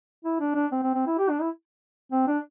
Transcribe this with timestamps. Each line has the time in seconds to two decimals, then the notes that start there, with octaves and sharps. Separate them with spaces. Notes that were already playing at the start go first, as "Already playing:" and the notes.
0.25 E4
0.40 D4
0.55 D4
0.72 C4
0.83 C4
0.94 C4
1.07 E4
1.18 G4
1.30 D4
1.41 E4
2.12 C4
2.28 D4